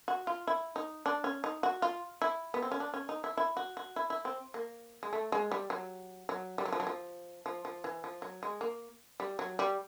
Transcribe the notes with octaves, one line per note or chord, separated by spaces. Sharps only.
F#4
F4
E4
D#4
D4
C#4
D#4
F#4
F4
E4
B3
C4
C#4
D4
C#4
D#4
E4
E4
F#4
F#4
E4
E4
C4
A#3
G#3
A3
G#3
G3
F#3
F#3
G3
F#3
F3
F#3
F3
F3
F3
E3
F3
F#3
G#3
A#3
G3
F#3
G3